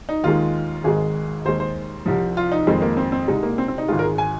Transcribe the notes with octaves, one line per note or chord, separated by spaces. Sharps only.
D#4
D#2 D#3 G#3 F4
G#1 G#2 D#3 G#3 G#4
D#2 D#3 G#3 C5
C5
C2 C3 F3
F4
D#4
F2 D#3 G#3 C4
A#3
C4
C4
C2 C3 G#3 D#4
A#3
C4
C4
D#4
G#1 G#2 G#3 F4
A#4
G#4
G#5